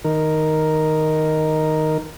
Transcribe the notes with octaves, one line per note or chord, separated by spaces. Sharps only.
D#3 A#4